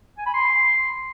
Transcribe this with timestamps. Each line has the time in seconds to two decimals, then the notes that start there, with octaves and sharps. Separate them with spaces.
0.18 G#5
0.26 B5
0.34 C6